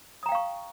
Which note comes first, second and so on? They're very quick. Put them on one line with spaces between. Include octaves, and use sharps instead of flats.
D#6 A#5 G5 F5 C#6